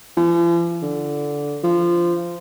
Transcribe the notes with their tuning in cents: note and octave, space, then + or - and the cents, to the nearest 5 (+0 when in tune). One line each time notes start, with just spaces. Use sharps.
F3 -45
D3 -10
F3 -15